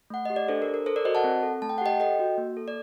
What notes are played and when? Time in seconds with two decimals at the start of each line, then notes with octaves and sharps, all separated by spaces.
0.10 A3 F#5
0.25 G4 D#5
0.36 D5
0.48 D4 A4 C5
0.62 A#4
0.68 A4
0.74 A#4
0.86 A4 C5
0.96 A#4 D5
1.05 F#4 C5 D#5
1.15 F#5 A5
1.24 C4
1.43 A4
1.62 A3 A5
1.70 G5
1.78 F#5
1.81 G4 D#5 G5
2.00 A4 D#5 G5
2.20 F#4
2.38 A#3
2.57 A4
2.68 D5